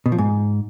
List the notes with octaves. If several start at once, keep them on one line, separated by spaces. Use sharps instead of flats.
B2
F3
G#2